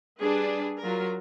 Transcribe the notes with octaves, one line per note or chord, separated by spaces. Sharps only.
G3 D4 G#4 B4
F#3 F4 A#4